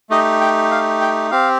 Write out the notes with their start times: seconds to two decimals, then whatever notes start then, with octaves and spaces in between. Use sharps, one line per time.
0.10 A3 D#4 G4 D#5
0.41 G5
0.71 F5
1.01 G5
1.31 C4 G4 F5